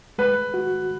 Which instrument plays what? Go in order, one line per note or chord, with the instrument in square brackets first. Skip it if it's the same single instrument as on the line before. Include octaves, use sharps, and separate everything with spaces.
[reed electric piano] G#3 [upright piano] B4
[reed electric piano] F#4